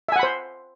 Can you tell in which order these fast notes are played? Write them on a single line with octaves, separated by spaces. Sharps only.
E5 G#5 F#5 B5 C5